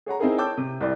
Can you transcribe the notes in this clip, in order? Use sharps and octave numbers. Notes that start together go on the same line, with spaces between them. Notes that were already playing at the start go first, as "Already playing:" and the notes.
G#4 C#5 F#5 A#5
C4 D#4 E4 G#4 A#4
C#5 G5 A5 D6 E6 G6
C3
C2 D5